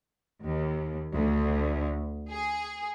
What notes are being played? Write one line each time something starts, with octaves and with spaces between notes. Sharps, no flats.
D#2
D2
G#4